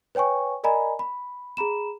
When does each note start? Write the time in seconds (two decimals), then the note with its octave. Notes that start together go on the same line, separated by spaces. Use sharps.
0.15 B4 C#5 G5 G#5 C#6
0.64 A#4 D5 D#5 G#5 A#5 B5
0.99 B5
1.57 G#4 A#5 B5 E7